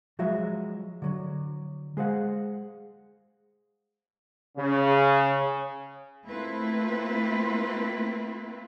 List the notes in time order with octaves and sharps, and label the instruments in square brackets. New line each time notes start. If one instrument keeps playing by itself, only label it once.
[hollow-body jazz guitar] F3 F#3 G#3 F#4 E5
D3 F#3
G#3 G#4 C5 F5 F#5
[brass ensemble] C#3
[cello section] A3 A#3 C4 E4 F4 B4